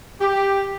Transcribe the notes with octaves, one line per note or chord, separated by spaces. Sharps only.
G4